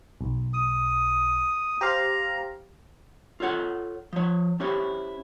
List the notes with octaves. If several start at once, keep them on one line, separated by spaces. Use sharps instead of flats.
B1
D#6
G4 C5 F5 A#5
F4 A4 C#5 F#5
F3 C#5
C#4 E4 G4 C5 C#5